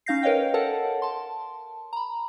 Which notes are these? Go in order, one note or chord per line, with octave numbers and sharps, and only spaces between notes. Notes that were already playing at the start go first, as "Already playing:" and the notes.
C#4 D#4 F5 G6 A#6 C7
A#4 B4 C#5 D#5 F5 G5
A4 A#4 C#5 F#5 A5
A5 C6
A#5 B5